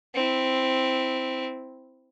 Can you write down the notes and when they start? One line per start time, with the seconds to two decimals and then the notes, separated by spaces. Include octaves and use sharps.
0.14 C4 E4